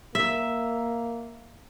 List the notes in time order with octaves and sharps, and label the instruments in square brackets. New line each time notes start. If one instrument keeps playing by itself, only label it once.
[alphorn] A#3 [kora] E5